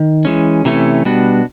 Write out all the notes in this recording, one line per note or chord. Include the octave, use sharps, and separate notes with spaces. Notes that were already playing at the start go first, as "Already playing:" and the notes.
Already playing: D#3
E3 G#3 C#4
C3 E3 A3 C#4
B2 G3 B3 D4 F#4